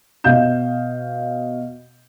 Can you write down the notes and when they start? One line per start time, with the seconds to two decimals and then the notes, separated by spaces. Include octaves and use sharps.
0.24 B2 D#5 F5 G6 E7